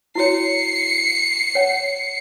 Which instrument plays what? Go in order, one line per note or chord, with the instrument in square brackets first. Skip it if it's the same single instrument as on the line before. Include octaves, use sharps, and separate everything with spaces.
[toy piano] E4 F#4 C#5 [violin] C7 C#7
[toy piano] C#5 F#5